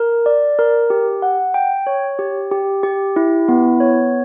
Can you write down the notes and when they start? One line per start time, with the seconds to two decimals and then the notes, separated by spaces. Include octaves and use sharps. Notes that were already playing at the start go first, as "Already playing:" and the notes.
Already playing: A#4
0.26 D5
0.59 A#4
0.90 G4
1.22 F#5
1.54 G5
1.87 C#5
2.19 G4
2.51 G4
2.83 G4
3.16 E4
3.48 B3
3.80 C#5